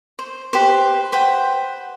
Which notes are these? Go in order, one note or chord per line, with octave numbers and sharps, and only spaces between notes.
C5
G4 B4 C5
B4 C5 F#5 G5